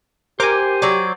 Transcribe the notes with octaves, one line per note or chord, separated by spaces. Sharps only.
G4 A#4 C5 G#5 D6
F#3 D5